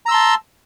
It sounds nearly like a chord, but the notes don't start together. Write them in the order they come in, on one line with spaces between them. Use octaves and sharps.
A#5 E6 C6 A5